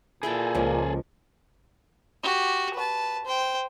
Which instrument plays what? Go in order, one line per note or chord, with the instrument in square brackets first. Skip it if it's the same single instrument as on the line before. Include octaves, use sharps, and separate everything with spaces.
[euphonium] A#2 [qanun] E4 G5 A#5 [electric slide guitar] G#4 A4
[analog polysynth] C#2 [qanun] F3 A#3
[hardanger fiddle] F#4 G4
B4 A5
C5 G5